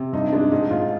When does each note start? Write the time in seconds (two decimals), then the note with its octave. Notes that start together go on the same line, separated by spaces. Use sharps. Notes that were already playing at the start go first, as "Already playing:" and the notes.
Already playing: C3
0.13 G2 D#4
0.33 G#3 D4
0.52 G#2 D#4
0.71 G#2 F4